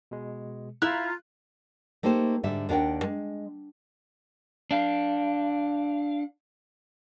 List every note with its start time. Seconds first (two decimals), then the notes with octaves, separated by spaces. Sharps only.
0.11 B2 G#3
0.82 E4 F4 E5 A#5 F6 F#6
2.03 A3 A#3 D#4 G4 C5
2.43 G#2 D3 G3 E5
2.69 D#2 D4 A#4 E5 F#5 G5
3.03 G#3
4.71 D4 F5